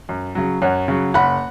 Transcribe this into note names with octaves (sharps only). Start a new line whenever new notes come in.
F#2
C#3 F#3
F#2 C#5 F#5
C#3 F#3
F#1 F#5 B5